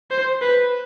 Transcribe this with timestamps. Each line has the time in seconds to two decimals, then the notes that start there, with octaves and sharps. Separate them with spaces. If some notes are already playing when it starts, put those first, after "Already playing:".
0.11 C5
0.42 B4